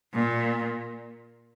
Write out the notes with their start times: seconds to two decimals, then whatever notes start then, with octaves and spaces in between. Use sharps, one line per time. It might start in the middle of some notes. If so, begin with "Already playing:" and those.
0.14 A#2